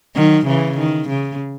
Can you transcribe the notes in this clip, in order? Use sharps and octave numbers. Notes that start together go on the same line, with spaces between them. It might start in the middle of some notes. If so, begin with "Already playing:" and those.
D#3 F#3
C#3 E3
D#3
C#3